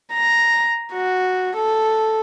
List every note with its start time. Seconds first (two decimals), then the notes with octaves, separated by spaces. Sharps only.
0.13 A#5
0.92 F#4
1.57 A4